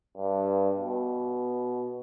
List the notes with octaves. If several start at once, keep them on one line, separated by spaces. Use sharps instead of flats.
G2
B2